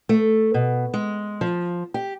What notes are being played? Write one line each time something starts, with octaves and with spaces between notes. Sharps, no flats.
A3
B2
G#3
F3
G4